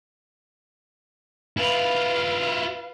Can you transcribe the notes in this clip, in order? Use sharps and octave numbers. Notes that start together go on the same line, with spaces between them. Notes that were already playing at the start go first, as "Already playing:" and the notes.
E4 F4 B4 F5